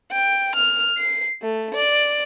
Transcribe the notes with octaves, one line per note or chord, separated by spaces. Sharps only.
G5
F6
C7
A3
D5